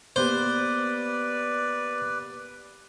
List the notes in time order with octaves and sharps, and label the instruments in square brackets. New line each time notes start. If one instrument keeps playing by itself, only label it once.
[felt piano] A#3 B3 G4 [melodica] B4 D5 [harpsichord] C5